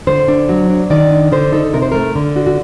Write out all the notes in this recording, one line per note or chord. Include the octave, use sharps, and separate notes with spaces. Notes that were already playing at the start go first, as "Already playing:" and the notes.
D3 C5
D4
F#3
D4
D#3 D5
D4
D3 C5
D#4 A4
C3 A#4
C5
A3 A#4
D3
D4 F#4
F#4